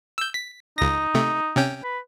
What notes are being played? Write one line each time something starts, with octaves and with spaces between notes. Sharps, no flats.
E6 G6
B6
C#2 D#4 A#6
C3 A3
C3 C#4 G5
B4